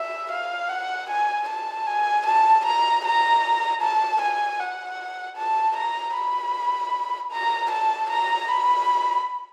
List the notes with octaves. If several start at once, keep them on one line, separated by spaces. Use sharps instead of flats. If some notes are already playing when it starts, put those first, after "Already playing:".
Already playing: E5
F5
F#5
G#5
A5
G#5
A5
A#5
A#5
A5
G#5
F#5
A5
A#5
B5
A#5
A5
A#5
B5